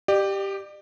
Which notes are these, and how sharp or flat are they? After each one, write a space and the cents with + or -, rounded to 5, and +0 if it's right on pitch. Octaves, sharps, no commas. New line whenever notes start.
G4 +0 D5 +40